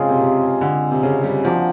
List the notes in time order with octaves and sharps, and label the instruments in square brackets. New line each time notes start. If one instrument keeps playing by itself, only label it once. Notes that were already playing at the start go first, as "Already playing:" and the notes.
Already playing: [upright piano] C#3 [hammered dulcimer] G#3 C4 F4 G#4
[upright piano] C3
C3
D3
C3
C#3
G3
[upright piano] F3 [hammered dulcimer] F#3 A#3 D4